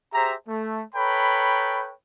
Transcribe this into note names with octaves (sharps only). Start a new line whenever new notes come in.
G4 G#4 C5 E5 A#5
A3
A4 B4 C#5 G5 A#5 B5